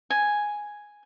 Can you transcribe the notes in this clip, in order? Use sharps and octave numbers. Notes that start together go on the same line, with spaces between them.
G#5